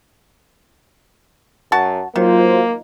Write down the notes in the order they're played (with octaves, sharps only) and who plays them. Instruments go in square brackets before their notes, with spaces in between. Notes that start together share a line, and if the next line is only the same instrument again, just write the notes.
[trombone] F#2 [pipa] F#4 A5
[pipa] D#3 [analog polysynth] F#3 F4 C5 [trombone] A#3